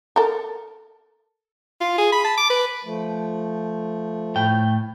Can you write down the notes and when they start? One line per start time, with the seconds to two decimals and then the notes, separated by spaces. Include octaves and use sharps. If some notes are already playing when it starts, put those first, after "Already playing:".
0.16 A4 A#4
1.81 F4
1.98 G#4
2.12 B5
2.25 A5
2.37 D6
2.50 B4
2.85 F3 A3
4.36 A2 G5